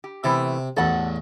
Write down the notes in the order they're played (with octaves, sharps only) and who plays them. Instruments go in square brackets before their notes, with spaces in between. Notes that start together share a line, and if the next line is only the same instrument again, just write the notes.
[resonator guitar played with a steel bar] G4
[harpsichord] C3 [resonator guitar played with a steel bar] E3 A3 B3
[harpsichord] A1 E2 [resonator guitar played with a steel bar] A4 F#5